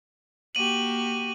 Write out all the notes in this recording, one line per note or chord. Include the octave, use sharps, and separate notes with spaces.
A#3 F#4 G4 D#7 F#7